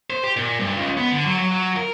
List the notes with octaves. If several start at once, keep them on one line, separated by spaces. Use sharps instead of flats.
C5
G4
A#2
G2
C#2
B3
D3
F#3
F#3
F#3
A#4